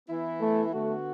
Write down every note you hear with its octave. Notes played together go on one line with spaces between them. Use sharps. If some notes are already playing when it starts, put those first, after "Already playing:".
E3 B3 E4
A3
D3 A3 B3 F#4